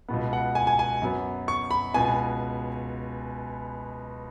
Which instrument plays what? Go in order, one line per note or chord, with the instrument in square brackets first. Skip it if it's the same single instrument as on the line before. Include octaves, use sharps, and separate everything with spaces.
[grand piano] C#2 B2 B3
F#5
G#5
G#5
G#5
F#2 F#3 B3
C#6
B5
C#2 B2 B3 G#5